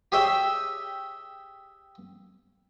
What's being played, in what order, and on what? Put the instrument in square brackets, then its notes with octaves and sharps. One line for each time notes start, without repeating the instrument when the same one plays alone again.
[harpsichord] G4 G#4 C#5 E5 G5